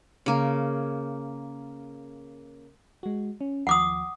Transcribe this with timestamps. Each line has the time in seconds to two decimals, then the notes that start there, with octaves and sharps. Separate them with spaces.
0.26 C#3 A#3
3.03 G#3 F#4
3.41 C#4
3.67 D#2 F3 F#5 D6 D#6